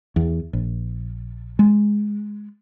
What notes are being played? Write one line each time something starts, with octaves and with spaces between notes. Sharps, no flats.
E2
A#1
G#3